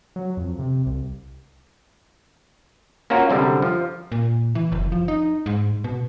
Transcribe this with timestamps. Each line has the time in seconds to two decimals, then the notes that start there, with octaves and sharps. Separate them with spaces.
0.16 F#3
0.37 F2
0.59 C3
0.86 C2
3.10 A#3 C#4 F4 F#4 A#4
3.29 C2 F#2 D3 G3
3.62 F3
4.12 A#2
4.55 E3
4.72 F#1
4.92 F3
5.08 D#4
5.46 G#2
5.84 B2